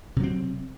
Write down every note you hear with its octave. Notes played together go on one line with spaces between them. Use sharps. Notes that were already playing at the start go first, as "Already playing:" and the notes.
C3 F#3 C4